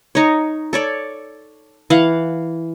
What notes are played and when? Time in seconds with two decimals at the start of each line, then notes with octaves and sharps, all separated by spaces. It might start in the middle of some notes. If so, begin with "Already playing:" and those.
0.15 D#4 C#5
0.73 A4 C#5 D5
1.90 E3 F5 F#5